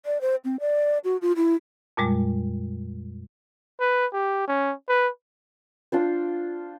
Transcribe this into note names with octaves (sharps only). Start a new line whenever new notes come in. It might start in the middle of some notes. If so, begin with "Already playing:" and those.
D5
C5
C4
D5
F#4
F4
E4
F2 A#2 G3 G#3
B4
G4
C#4
B4
D4 F4 C5